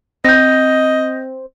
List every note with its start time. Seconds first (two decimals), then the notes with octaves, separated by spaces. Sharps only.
0.25 C4 D#5 G6 A#6